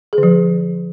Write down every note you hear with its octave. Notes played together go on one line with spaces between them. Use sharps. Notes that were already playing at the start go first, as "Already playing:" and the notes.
G#4
D3
F3